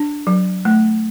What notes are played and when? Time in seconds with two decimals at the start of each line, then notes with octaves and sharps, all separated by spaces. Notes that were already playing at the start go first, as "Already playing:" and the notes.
Already playing: D4
0.27 F#3
0.65 A3